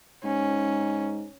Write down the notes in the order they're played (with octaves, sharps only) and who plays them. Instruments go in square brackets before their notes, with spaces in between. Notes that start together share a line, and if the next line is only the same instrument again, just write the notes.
[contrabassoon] G#2 [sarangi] C#4